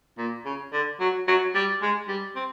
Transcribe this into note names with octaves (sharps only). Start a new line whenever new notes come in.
A#2
C#3
D3
F#3
F#3
G3
G#3
G3
C4